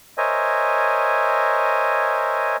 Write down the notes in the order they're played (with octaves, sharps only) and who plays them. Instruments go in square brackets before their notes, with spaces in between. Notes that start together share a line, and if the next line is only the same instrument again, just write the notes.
[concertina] A#4 C5 C#5 D#5 E5 G#5